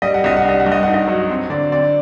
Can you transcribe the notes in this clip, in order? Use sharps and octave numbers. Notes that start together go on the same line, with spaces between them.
G3 D#5
F#5
C2 D#5
F#5
D4 D#5
F#5
G2
D#5
D#4 F#5
D#5
F#3
C4
D3 D5
C4 D5